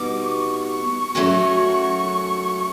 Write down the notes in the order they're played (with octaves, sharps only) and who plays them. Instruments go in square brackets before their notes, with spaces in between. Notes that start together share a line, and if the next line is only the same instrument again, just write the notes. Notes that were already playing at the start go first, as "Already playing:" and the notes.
Already playing: [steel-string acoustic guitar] B2 G3 B3 D#4 [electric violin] D6
[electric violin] C#6
C#6
[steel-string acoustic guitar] F#3 A3 C#4 F#4 A#4